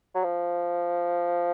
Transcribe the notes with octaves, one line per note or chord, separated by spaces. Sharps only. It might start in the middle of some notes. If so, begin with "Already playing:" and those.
F#3
F3